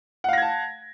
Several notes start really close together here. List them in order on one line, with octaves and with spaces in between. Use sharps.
F#5 F5 A#6 G#6 A5